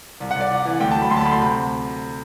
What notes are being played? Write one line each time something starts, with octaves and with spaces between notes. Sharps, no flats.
C2
C2 F#5
D5
C2
E3
D2 G5
A5
F#3
B5
D2 C6
A5
D2 B5
C6
C3 B5